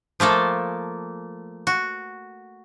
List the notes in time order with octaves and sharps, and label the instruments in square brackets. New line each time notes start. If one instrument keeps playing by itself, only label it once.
[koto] F3 A3 A#3 A4
F#4